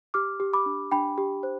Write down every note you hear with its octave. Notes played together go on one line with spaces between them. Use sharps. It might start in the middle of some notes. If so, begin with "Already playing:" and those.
G4 D6 F6
G4
B5 D6
D4
D4 G5 B5
G4
C5